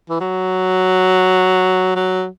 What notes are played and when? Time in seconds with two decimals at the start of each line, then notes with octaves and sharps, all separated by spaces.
0.10 E3
0.20 F#3
1.96 F#3